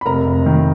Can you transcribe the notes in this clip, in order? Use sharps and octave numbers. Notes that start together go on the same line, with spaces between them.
B5
F1 A#4 A#5
F1
D#3